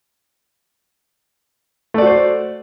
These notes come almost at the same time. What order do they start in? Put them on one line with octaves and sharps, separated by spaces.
A3 D5 F#4 C5